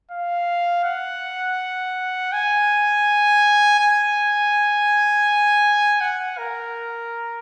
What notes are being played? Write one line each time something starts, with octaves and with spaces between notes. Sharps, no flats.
F5
F#5
G#5
G#5
F#5
A#4